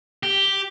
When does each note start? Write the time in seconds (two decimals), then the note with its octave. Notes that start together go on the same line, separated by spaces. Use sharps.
0.23 G4